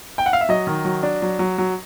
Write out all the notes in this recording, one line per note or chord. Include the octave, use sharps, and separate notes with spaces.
G5
F#5
F5
E5
F#3 D#5
D#3
F#3
D4
F#3
F#3
F#3